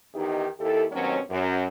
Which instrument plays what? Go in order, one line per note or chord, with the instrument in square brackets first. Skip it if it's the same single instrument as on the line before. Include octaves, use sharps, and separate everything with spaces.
[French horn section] E2 D#3 D#4 E4 G4
D#2 E4 G4 A4
D#2 B2 D#3 F#3 C4 C#4
F#2